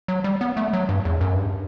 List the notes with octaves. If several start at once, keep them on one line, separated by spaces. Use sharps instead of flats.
F#3
G3
B3
A3
F#3
G2
E2
F#2
G2